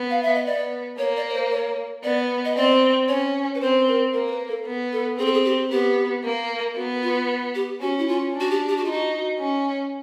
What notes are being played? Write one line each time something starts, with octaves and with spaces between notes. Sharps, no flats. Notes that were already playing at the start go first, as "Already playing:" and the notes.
Already playing: B3
F5
E5
D#5
B3 D5
A#3 C#5
D5
C#5
C5
C#5
B3 D5
D#5
C4 D5
C#4 C#5
B4
C4 C5
A#4
A#3 A#4
A#4
B4
A4
B3
A4
C4 G#4
A4
G#4
G4
B3 G4
A#3
B3 F#4
F4
G4
C#4 F#4
E4
F4
D4
F#4
G4
G4
F#4
D#4 F4
F#4
C#4